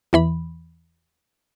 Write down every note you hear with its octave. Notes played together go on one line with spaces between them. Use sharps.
E2 E3 B5